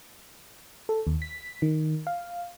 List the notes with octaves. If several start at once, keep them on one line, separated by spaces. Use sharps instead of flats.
A4
D#2
B6
D#3
F5